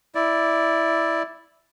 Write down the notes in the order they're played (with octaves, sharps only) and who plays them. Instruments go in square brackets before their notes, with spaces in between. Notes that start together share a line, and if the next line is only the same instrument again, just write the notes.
[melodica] E4 D5